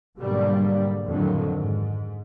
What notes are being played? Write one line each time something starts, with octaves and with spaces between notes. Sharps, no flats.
G#2 B2 D3 F#3 G3 A#3
F2 A2 D3 D#3 F#3
G#2